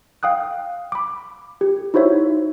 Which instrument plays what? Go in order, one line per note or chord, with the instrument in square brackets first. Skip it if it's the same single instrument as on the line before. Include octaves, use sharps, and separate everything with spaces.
[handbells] F5 G5 D#6 F#6
B5 D6
G4
D#4 E4 F#4 C5 C#5 E5